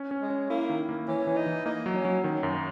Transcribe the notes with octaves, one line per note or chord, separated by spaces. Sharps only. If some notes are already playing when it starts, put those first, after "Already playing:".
Already playing: C#4
C#4
G#3
C#4
A#3 E4
D#3
A#3
E3 C#4
E3
D#4
E3
A#3 D#4
F#3
C#4
F#3
D#3 C#4
F#2
A#3